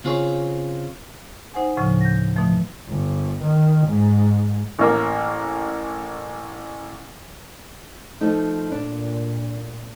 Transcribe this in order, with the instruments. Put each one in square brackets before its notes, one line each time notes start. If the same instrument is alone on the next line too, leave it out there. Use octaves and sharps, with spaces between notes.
[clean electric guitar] C#3 C4 F4 G#4 C#5
[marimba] D#4 C5 F#5 G#5
D2 A2 C#3 F3
G6 A#6
B2 E3 F3 A3
[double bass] G1
D#3
G#2
[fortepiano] A1 A#3
[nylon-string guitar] F3 A3 D#4
[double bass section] A#2 [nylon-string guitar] D4